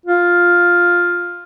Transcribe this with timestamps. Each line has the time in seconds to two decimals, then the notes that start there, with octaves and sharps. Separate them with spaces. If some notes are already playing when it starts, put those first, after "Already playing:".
0.06 F4